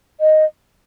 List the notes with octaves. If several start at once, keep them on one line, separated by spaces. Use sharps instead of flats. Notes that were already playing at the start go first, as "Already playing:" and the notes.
D#5